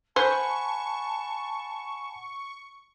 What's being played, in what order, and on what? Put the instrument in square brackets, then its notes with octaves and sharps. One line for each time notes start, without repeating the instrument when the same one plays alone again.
[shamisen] C5 [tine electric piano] F#5 G#5 B5 [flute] A5 [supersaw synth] C#6